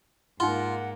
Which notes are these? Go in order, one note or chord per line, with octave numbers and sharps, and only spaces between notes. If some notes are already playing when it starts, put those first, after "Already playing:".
G#2 A#3 D#4 F4 F#5 C6